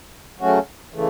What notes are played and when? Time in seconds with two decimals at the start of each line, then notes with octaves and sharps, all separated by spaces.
0.40 C#3 F#3 A3 C#4 F#4
0.94 C#3 E3 A3